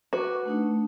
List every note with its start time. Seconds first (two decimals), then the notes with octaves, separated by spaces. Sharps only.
0.13 F#4 B4 C#6 D6
0.45 A3 D4 D#4